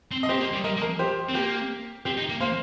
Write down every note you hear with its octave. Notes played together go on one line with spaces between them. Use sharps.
C4
D#5
C4 G4 C5
A#3
G3
G3 A#4 D#5
A#3
A#4 D#5
G4 C5
C4
A#3 G4
C4 G4
D#4
A#3
A#3 C5 F5